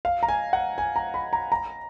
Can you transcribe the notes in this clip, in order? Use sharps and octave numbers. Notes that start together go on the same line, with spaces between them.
F5
A#5
G#5
F#5
G#5
A#5
B5
A#5
A#5